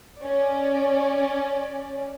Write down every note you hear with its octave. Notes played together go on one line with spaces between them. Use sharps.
C#4 D5